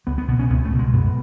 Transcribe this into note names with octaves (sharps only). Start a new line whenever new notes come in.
C#2 B3
B3
B2 B3
C#4
C#2 B3
A3
B2
G#3
F#2 B3